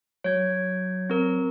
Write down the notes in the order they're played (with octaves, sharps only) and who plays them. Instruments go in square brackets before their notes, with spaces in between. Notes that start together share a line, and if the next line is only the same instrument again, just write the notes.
[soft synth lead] F#3 [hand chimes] C#5 G#6
[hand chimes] C4 A#4